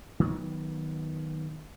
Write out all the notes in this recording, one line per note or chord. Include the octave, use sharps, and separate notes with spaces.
D#3 F#3 B3